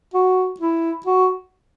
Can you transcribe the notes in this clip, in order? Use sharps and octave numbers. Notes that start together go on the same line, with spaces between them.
F#4
E4
F#4